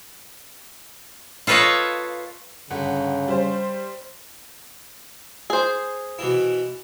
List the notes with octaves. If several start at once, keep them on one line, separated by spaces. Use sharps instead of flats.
F4 A4 B4 C#5 D#5 F5
G1 C#3 F#5
G3 C5
G#4 C5
B2 E3 E4